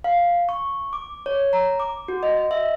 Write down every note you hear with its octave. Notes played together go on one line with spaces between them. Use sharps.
F5
C#6
D6
C#5
A#5
D6
F#4
D#5
D#5
E5